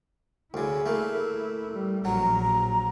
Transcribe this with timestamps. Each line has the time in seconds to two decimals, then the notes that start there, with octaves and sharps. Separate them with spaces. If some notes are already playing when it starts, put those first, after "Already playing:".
0.54 D2 C#3 E4
0.86 A3 A#3
1.73 G3
2.05 A#1 F#3 A#5